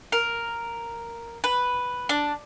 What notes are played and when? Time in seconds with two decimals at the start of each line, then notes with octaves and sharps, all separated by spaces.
0.12 A#4
1.44 B4
2.09 D4